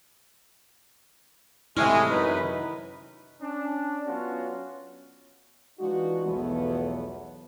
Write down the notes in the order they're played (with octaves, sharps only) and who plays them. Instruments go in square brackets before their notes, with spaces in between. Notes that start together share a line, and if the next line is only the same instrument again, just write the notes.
[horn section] A2 G#3 [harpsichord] C3 C#4 [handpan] E4
[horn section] F#2 D#4 B4
C#4 D4
F#3 B3 C#4 F4 F#4
[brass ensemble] E3 G#3 D4 D#4 F4 F#4
B1 E2 E3 F3 A3 B3